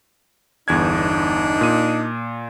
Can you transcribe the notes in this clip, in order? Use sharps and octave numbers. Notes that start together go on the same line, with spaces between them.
G1 E2 D4 D#4 G#6
A#2 D#7